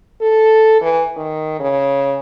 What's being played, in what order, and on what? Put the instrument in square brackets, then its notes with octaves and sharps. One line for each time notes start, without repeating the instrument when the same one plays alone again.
[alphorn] A4
E3
D#3
C#3